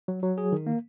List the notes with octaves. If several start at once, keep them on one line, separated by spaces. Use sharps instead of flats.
F#3
F#3
G#4
D#3
A#3